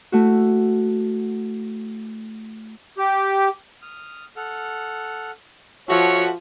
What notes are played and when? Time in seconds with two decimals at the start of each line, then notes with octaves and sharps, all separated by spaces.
0.12 A3 E4 F#4
2.98 G4
3.82 D#6 F6
4.36 A4 F#5 F6
5.89 F3 F#4 A4 C#5 E5 F#5